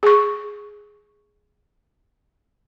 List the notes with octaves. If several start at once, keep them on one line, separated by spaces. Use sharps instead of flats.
G#4 C#6